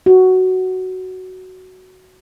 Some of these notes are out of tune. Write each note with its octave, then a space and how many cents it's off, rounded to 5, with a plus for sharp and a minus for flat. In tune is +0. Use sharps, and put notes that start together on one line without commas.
F#4 +10